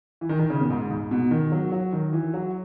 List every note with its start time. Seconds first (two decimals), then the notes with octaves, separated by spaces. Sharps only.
0.21 E3
0.29 D#3
0.39 D#3
0.50 C#3
0.60 B2
0.70 G#2
0.91 G#2
1.11 B2
1.31 D#3
1.52 F#3
1.72 F#3
1.93 D#3
2.13 E3
2.34 F#3